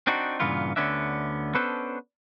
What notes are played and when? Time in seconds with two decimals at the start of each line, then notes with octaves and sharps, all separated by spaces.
0.07 C4 D4 D#4 F#4
0.40 G2 A#2 C#3 E3 B3 F4
0.76 D2 D3 B3 C#4 D4 E5
1.55 B3 C#4 D4 A4 B4 C5